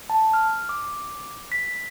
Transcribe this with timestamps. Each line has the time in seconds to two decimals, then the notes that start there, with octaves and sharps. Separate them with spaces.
0.10 A5
0.34 F6
0.69 D6
1.52 B6